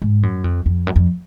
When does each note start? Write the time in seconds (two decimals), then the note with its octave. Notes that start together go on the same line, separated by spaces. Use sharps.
0.02 G#2
0.23 F#2
0.44 F2
0.66 F2
0.87 F#2
0.96 F2